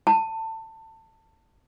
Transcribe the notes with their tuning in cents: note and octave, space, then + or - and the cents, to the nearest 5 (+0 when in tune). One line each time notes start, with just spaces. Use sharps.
A5 +25